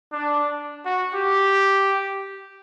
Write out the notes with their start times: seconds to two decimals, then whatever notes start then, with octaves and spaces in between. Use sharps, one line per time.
0.12 D4
0.85 F#4
1.14 G4